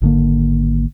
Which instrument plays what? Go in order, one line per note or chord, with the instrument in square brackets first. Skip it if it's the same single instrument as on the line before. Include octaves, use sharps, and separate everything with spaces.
[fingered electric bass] G#1 D3 A#3